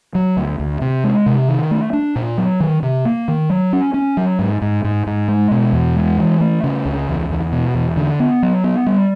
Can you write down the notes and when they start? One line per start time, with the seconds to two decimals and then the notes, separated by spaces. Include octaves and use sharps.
0.15 F#3
0.37 D2
0.60 D2
0.81 C3
1.04 G#3
1.26 C3
1.48 D#3
1.71 A3
1.93 D4
2.16 A#2
2.38 F#3
2.60 D#3
2.83 C3
3.05 A#3
3.28 D#3
3.50 F#3
3.73 C#4
3.94 C#4
4.17 F#3
4.39 G#2
4.62 G#2
4.84 G#2
5.07 G#2
5.28 G#3
5.51 B2
5.73 E2
5.96 G#3
6.18 E3
6.41 A3
6.64 C#3
6.85 C#2
7.08 E2
7.30 E2
7.52 B2
7.74 E2
7.97 D3
8.20 B3
8.43 F#3
8.64 B3
8.86 G3